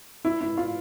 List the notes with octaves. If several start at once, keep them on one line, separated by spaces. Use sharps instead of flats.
E4
E4
F4